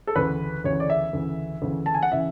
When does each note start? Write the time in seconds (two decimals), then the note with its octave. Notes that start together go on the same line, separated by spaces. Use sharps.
0.07 A4
0.16 D2 C#3 E3 B4
0.64 D2 C#3 E3 C#5
0.80 D5
0.90 E5
1.13 D2 C#3 E3
1.62 D2 C#3 E3
1.86 A5
1.94 G#5
2.03 F#5
2.12 C#3 E3 E5